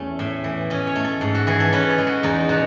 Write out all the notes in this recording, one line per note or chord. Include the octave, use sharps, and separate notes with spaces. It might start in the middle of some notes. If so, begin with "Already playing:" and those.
Already playing: E2 A3 C#4
A2 E5
E3
C#4 D#5
C#5
A3
A4
G#2 A4
F#4
E3 G#4
A4
C#4 B4
D#5
G#3
F#4
E2 D#4
B2 F#4